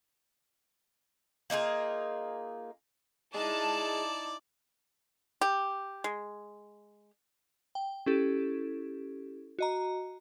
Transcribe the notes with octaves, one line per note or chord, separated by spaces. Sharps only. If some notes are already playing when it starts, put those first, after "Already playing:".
A#3 D#4 F4 G#4
D#4 E4 G#4 D5 D#5 A5
G4
G#3
G5
C#4 E4 G4 A4
F#4 D#5 A#5